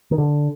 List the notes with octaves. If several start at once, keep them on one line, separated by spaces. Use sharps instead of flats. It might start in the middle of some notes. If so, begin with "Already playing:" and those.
D#3
D3